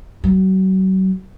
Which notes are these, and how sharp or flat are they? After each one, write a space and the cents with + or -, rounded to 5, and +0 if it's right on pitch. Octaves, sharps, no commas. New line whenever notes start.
F#3 +35